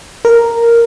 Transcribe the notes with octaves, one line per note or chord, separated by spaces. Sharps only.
A#4